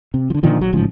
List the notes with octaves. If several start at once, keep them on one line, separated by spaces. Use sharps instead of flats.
C3
D3 F3
A#2 D3 D#3 F3
A#1 F#3
A1 G#2 C#3 F3